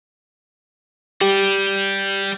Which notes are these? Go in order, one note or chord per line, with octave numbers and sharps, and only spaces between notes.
G3 G4